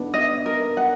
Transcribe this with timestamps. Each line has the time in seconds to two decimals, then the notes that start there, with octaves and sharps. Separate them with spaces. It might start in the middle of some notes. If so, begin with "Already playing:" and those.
Already playing: B3 D4 D#4
0.14 D#5
0.46 A#4
0.77 F#5